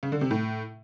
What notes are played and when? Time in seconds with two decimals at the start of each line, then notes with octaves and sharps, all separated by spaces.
0.03 C#3
0.12 D3
0.21 C3
0.31 A2